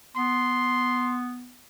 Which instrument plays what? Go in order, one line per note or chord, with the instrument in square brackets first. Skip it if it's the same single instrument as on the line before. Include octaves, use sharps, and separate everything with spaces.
[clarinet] B3 [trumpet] C6